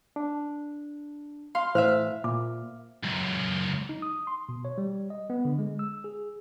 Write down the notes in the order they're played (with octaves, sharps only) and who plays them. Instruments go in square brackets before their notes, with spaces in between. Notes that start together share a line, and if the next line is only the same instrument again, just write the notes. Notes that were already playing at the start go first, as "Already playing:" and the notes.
[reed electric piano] D4
[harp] F5 C6
[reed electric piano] A2 E3 [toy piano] C5 [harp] E5 F5 F6
[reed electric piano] A#2 [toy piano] D6
[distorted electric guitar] C#2 F#2
[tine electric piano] D#4
D#6
C6
B2
C#5
G3
D#5
B3
D3
G#3
E6
G#4